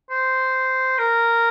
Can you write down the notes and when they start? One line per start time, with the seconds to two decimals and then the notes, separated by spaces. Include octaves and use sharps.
0.10 C5
0.98 A#4